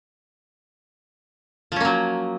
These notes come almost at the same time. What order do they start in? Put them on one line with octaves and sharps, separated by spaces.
F3 C#4 A#3 F#3